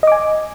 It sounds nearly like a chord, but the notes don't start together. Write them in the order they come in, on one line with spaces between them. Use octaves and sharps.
D#5 D6 G#5